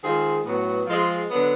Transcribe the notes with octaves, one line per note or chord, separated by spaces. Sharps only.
D#3 G#3 C4 F4 G#4
A2 F#3 B3
F3 G#3 C4 F4 G#4
D3 F#3 B3